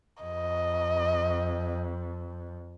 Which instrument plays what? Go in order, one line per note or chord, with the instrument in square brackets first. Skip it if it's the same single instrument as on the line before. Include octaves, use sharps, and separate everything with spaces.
[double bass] F2 [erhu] D#5